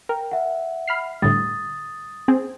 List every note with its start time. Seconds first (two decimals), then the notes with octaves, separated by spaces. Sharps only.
0.09 A#4 G5
0.31 E5 F#5
0.88 B5 F6 C7
1.22 A2 D3 G3 D#6 A6
2.28 C4 G#4